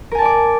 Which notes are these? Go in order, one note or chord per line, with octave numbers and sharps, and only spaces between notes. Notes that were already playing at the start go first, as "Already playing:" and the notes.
A#4 D5 G#5 A5 D6